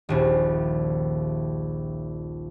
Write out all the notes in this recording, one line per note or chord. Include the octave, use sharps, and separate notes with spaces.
D#1 A#1 D#2